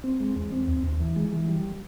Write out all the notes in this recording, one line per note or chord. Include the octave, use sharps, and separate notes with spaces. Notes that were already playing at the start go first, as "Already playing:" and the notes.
C4
G#3
E2
C4
D#2
D#2
E3
G#3
E3
G3